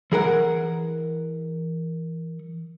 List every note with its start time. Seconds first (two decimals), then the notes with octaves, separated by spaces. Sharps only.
0.12 E3 G#4 A#4 F#5